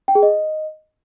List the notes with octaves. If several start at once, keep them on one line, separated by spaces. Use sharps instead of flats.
G5
G#4
D#5